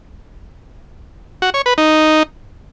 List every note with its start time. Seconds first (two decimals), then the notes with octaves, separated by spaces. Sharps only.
1.42 F#4
1.54 C#5
1.66 B4
1.78 D#4